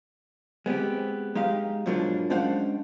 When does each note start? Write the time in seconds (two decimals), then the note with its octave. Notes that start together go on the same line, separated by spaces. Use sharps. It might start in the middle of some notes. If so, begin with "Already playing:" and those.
0.66 G#3 B3 C4 G4
1.35 G#3 D#4 G4 F5
1.86 G#2 B2 F3 F#3 A#3 D4
2.30 G#3 C#4 D4 C5 F5 F#5